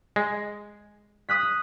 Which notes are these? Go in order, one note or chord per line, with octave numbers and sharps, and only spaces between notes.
G#3
D#6 F#6 B6